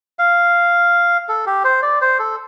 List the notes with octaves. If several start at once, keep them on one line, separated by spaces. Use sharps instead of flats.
F5
A4
G4
C5
D5
C5
A4